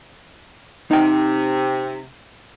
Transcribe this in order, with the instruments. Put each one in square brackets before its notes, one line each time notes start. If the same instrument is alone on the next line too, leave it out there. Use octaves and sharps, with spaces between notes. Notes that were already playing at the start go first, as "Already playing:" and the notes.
[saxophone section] C3 [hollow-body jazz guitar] D#4 F#5 G5